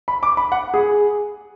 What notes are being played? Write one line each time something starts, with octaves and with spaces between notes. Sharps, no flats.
B5
D6
B5
F#5
G#4